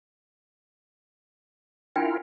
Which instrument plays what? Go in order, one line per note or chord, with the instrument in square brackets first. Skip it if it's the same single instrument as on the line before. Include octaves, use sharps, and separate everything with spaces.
[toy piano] C#4 D4 G5 [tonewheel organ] E4 F4 A#4